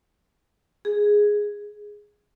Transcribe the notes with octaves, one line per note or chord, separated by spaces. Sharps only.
G#4